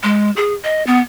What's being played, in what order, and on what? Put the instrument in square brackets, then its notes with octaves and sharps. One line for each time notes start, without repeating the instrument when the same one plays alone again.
[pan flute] G#3
G#4
D#5
B3